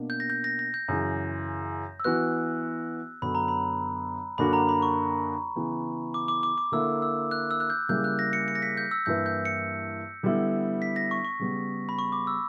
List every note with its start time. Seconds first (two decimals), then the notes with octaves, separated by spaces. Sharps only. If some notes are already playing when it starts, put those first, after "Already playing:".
Already playing: B2 A#3 D4
0.10 G6
0.20 A#6
0.30 G6
0.44 A#6
0.59 A#6
0.74 G6
0.88 F#2 C#3 E3
2.00 E6
2.04 E3 B3 F#4 B4 F#6
3.22 F#2 D3 F#3 B3 B5
3.35 A#5
3.48 B5
4.38 F#2 D3 A#3 D4 F#4 B5
4.53 A#5
4.69 B5
4.82 C#6
5.56 C#3 E3 B3
6.14 D6
6.28 D6
6.43 D6
6.58 D6
6.72 D3 A#3 E4 E6
7.02 E6
7.31 F#6
7.51 E6
7.60 F#6
7.70 G6
7.89 C#3 G3 A#3 E4 G6
8.04 F#6
8.19 A#6
8.33 C#7
8.48 C#7
8.55 A#6
8.62 B6
8.77 G6
8.91 E6
9.06 G2 E3 A#3 E4 B4 G6
9.26 G6
9.45 C#7
10.23 D3 G3 B3 E4
10.82 B6
10.96 A#6
11.11 C#6
11.25 C#6
11.39 C#3 G3 B3
11.89 B5
11.99 C#6
12.12 D6
12.27 E6